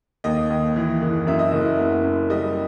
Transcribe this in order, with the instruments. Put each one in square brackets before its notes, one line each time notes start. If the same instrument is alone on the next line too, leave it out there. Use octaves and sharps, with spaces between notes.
[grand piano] D#2 D#5
D#2
E3
F#1
F#2 E5
D#5
F#1 E5
B3
F#2
G3 D#5